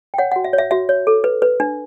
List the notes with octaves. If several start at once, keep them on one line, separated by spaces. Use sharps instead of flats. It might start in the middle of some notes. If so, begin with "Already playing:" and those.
G5
C#5 F#5
F#5
F#4
E5
C#5
E5
F#4 E5
C#5
A4
B4
B4
D4